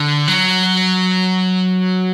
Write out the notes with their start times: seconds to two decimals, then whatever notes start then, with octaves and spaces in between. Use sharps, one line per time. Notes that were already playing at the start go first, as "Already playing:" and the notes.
Already playing: D3
0.28 F#3